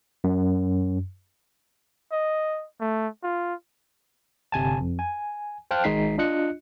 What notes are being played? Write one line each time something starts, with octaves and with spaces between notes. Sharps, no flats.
F#2
D#5
A3
F4
G1 C3 G#5 A5
F2
G#5
C5 F5 G5 A5 F6 F#6
G#1 D#3 G#3 D#4 B6 C7
D4 F4 D#5 F#6 C#7